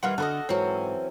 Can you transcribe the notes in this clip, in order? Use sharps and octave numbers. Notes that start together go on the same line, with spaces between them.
D#3 E3 G3 F4 F#5 F6
D3 F#4 A4 B4 D#5
G#2 E3 F#3 C4 C#4